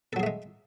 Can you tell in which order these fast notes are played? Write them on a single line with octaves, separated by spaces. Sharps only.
A4 F#3 G#4 A3 G#3